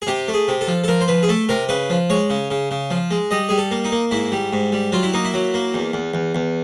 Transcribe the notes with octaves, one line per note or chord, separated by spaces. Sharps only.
G#4
C3 G4
A3
G#4
C3
A4
F3
A4
F3 A#4
C5
F3 B4
G#4
A3 A4
C3 A#4
C#3 B4
F3
G#3 C#5
C#3
C#3
C#3
F3
G#3
G3 D#5
G3 G#4
A4
A#3
D#4
A#3
G#2 E4
G3
G#2
G3
F#3 F4
E4
A#3 D#4
E4
F#3
A#3
E2
E2
E2
E2